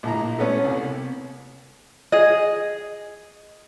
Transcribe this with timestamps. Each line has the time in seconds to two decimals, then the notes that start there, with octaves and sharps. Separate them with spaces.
0.03 A#1 A2 A#5
0.39 A3 B3 C#4
0.64 C2
2.12 G#4 D#5